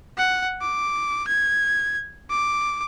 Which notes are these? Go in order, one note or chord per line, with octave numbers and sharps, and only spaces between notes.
F#5
D6
G#6
D6